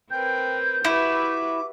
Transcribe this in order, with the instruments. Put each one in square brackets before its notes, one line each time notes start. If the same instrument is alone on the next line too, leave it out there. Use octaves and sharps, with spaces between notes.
[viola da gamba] C4 A#4 B4 [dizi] G5 [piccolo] G6
[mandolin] E4 [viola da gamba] F#4 G4 B4 [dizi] D6